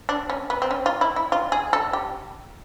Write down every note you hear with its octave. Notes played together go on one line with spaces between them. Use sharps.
D4
C#4
B3
C4
C#4
F4
E4
E4
F4
G#4
A4
G4